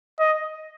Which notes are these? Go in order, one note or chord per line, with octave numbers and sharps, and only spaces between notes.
D#5